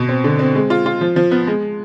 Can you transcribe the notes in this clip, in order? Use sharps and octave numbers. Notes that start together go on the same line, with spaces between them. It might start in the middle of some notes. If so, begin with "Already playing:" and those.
Already playing: B2
C4
D3
C4
G#3
F4
F4
F3
F3
B3
G#3